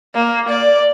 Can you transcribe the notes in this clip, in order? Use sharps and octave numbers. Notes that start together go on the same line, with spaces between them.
A#3
D5